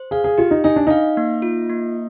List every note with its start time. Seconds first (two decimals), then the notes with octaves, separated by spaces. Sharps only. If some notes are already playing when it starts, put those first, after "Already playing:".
Already playing: C5
0.11 G#4 F5
0.24 G#4
0.38 F4 G4
0.51 D#4
0.64 D#4 G#5
0.76 D4
0.87 D#4 F5
1.17 A#3
1.42 F4
1.70 A#3